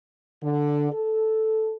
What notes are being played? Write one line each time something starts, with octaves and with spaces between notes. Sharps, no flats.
D3
A4